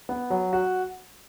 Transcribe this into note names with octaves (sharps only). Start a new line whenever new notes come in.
B3
F#3
F#4